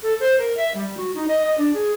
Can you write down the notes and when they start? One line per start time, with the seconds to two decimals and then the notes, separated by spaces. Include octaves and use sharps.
0.03 A4
0.20 C5
0.39 A#4
0.57 E5
0.75 G3
0.97 F#4
1.15 D#4
1.28 D#5
1.45 D#5
1.58 D4
1.74 G#4